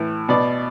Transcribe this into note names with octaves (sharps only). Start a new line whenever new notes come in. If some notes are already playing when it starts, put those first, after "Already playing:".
Already playing: A2 E3
B2 D5